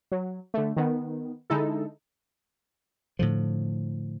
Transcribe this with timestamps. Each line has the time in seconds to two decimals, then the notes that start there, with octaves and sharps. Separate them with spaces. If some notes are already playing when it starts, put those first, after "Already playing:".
0.12 F#3
0.54 D3 A3
0.76 D#3 B3
1.50 D3 G#3 D#4 E4 A4
3.19 A2 D3 F3